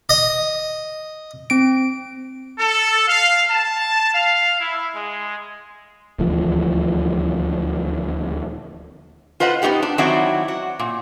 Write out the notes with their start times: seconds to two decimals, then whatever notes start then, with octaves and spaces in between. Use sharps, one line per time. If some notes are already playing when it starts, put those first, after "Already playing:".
0.09 D#5
1.50 C4 D7
2.58 A4
3.07 F5
3.50 A5
4.13 F5
4.59 E4
4.94 G#3
6.19 D#1 D2 E3 F3
9.40 F4 B4 C5 D#5 F#5
9.62 B3 C#4 D#4 G4 F#5
9.82 D4
9.98 D#3 F#3 C4 E4 F#4 D5
10.48 F#4
10.79 A#2